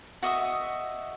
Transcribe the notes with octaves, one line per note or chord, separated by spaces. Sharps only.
F#4 D#5 E5 D#6